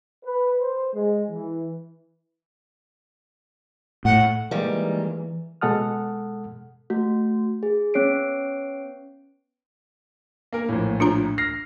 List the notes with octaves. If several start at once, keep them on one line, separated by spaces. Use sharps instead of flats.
B4
C5
G#3
E3
A2 F#5
D#3 E3 G3 G#3 A#3
B2 G#3 A4 F#5 D#6 F6
A3 F#4
G#4
B3 C#4 C#5 C7 D7
A#3 A#4
A#1 A2
D4 F4 A#5
F6 A#6 C7